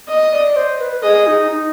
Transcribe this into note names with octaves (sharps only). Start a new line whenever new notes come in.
D#5
D5
C5
B4
B4
G#4 D#5
D#4
D#4